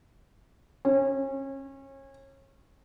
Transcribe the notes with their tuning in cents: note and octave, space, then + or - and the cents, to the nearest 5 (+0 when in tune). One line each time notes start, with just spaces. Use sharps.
C#4 -30